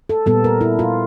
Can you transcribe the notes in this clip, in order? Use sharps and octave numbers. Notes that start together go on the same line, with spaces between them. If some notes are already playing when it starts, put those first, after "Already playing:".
A4
A#2 G3 B3 A4
A#4
E4
F4